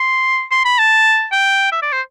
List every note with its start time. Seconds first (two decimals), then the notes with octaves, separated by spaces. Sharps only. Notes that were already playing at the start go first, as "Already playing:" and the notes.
Already playing: C6
0.51 C6
0.65 B5
0.78 A5
1.32 G5
1.72 E5
1.82 D5
1.92 C5